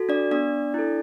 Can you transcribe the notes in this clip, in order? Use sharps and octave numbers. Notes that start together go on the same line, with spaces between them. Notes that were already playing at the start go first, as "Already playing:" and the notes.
Already playing: F#4 A4
D4 D5
B3 D4 D5
E4 A4